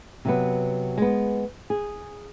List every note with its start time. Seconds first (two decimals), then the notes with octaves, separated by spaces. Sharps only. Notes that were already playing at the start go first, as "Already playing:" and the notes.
0.25 C3 F#3 B3
0.98 G#3 B3
1.70 G#4